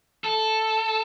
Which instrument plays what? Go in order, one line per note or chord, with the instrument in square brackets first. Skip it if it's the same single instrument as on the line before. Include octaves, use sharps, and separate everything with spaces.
[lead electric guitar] A4